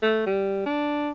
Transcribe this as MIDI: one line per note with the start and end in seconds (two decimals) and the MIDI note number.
0.02 0.22 57
0.26 0.65 55
0.65 1.10 62